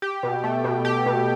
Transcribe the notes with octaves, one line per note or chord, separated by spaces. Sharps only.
G4
B2
A3
B2
G4
B2